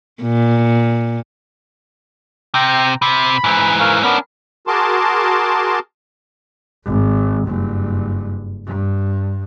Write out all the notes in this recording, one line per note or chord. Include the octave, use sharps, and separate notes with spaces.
A#2
C3 G5 A#5
C3 B5
G#2 E3
A#4 F5 C#6
B3 C#4 D4 A#4
F#4 G#4 A#4 A5 C6 D6
G#1
F#1 G2
G2